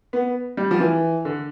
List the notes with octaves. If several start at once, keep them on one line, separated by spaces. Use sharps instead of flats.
B3
G3
F3
E3
D3